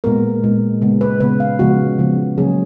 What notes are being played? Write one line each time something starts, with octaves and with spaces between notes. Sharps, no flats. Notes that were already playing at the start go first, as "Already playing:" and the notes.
A#2 G#3 B3 A#4
A#2 G#3 B3
C#3 G#3 B3
B4
C#3 G#3 B3 B4
F5
C#3 F3 G#3 B3 F#4
C#3 F3 G#3 B3
C#3 F#3 A#3 C#4 G#4